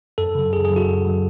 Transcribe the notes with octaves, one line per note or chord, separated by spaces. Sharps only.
F#2 A4
C#3 F#3
F#2 G#4
G#4
C#3 F#3
F#4
F#2
C#3 F#3